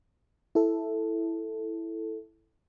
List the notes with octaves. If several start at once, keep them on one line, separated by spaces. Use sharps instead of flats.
E4 A4